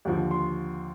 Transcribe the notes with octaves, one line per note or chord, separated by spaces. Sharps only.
D#2 D3 F3
C6